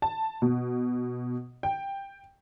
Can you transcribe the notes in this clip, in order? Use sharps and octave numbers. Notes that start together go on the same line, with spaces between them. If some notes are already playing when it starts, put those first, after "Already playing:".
A5
B2
G5